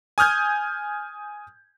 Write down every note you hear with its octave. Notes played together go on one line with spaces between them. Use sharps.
G#5 D#6 F6 G6 G#6